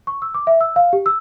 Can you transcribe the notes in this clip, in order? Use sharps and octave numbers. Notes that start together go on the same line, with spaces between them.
C#6
E6
D6
E5
E6
F5
G4
E6